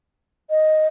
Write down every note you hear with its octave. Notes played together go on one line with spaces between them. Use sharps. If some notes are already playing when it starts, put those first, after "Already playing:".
D#5